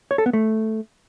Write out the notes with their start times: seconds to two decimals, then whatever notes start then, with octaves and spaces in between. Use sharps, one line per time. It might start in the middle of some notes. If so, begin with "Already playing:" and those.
0.11 C#5
0.18 A4
0.26 B3
0.33 A3